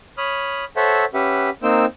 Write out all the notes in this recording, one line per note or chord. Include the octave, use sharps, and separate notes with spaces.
C#5 B5 D#6 F6
A4 C5 C#5 E5 F#5
C#4 G4 B4 E5 F#5
A#3 C4 D#4 C5 G5 E6